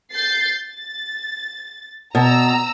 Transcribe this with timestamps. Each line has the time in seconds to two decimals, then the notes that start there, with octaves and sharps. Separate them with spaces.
0.12 G6 A6 C7
0.67 A6
2.15 B2 A#5 E6